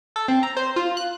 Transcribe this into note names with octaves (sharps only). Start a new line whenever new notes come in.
A4
C4
A#5
C5
F4
F#6